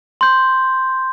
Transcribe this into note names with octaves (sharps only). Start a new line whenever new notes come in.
C6 G6